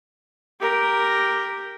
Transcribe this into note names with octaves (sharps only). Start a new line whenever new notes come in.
G4 A#4